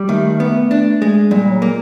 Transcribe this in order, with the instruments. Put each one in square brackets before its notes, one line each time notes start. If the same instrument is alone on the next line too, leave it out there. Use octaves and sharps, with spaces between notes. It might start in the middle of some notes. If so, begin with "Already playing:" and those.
Already playing: [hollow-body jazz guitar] G3
[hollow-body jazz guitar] D#3 [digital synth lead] A3
[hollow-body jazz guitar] B3
D4
G#3
[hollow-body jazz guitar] A#2 [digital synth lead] G3
[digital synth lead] G3
F#3
[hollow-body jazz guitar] A#3